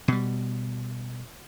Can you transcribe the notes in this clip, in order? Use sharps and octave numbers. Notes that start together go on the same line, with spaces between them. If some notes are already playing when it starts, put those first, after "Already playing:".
B2 G3